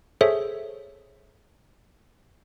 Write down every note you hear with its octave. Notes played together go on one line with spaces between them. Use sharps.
G#4 A4 C5 C#5 E5